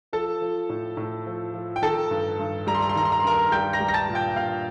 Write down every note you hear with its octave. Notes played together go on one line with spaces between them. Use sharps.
F3 A4 A5
F3
A2
A2
F3
F3
G5
D#3 A4 A5
G2
G2
G3 A#5
C6
A#5
C6
D#3 A#5
C6
A#5
C6
G2 A#4 A#5
G3 G5 G6
A#5 A#6
G3
A#6
A5 A6
A#2
G5 G6
A#2 F5 F6